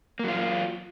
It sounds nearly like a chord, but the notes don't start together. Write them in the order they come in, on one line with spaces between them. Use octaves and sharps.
A#3 F#3 F4